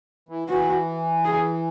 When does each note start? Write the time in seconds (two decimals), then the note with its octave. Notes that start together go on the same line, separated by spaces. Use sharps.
0.29 E3
0.48 E3 F#4
1.25 G#4